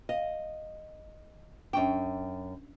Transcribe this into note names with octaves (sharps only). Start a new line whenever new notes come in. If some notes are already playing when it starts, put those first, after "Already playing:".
D#5 F5
F#2 C#4 D4 G5